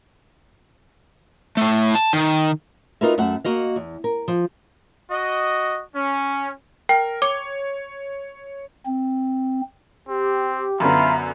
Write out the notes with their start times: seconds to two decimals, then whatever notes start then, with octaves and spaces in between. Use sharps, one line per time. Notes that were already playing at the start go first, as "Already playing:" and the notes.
1.57 A2 A3
1.95 A5
2.13 D#3
3.01 D#4 F4 F#4 A#4 B4 E5
3.18 F#2 A3 E5 F#5
3.44 A#3 F#4 D#5 F5
3.76 E2
4.04 A#4
4.28 F3
5.10 F#4 D#5
5.95 C#4
6.89 A#4 G5
7.22 C#5 D6
8.86 C4
10.09 C4 G4
10.80 F#2 D3 B3 F4 E5 A#5 B5